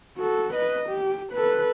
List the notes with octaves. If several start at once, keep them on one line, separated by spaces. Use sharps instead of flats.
F#4 A4
B4 D#5
G4
A4 B4